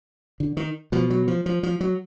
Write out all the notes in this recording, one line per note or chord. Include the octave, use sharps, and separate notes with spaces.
D3
D#3
B2 F3
F#3
F3
F3
F3
F#3